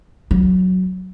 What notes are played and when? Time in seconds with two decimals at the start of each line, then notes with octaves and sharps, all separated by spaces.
0.31 F#3